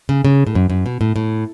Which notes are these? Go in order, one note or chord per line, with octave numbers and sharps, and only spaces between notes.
C#3
C#3
A2
F#2
F#2
B2
A2
A2